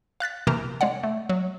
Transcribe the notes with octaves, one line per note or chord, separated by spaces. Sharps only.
F5 F#6 A6 B6
C3 E3 A#3 G4 A#4
G#3 C#5 D5 F#5
A3
F#3